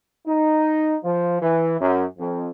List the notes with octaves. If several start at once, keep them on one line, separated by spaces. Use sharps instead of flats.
D#4
F3
E3
F#2
F2